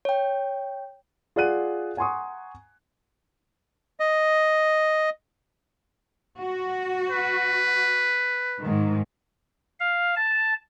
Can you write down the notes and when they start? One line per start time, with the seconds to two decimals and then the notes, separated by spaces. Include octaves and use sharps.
0.05 C#5 G5
1.36 F4 G#4 D5 F#5 F#6 D#7
1.97 F#5 G#5 A#5 C6 C#6 D#6
4.00 D#5
6.39 F#4
7.10 B4
8.59 G#2 D#3
9.80 F5
10.16 A5